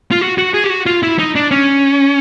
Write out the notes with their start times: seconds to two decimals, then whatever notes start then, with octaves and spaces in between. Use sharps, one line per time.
0.11 F4
0.21 F#4
0.38 F#4
0.54 G#4
0.64 G4
0.70 F#4
0.86 F4
1.03 E4
1.19 D#4
1.35 D4
1.51 C#4